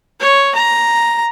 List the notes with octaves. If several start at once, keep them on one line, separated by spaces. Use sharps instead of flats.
C#5
A#5